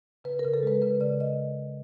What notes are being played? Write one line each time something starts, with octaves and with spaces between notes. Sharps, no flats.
C#3 B4
A#4
C#3
A4
G#3 B4
C#3 B4
C#3 D5
C#3 D#5